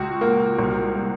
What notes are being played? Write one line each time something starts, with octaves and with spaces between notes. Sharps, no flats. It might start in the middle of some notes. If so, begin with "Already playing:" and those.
Already playing: C#2 F#4
A#3
C2
A#3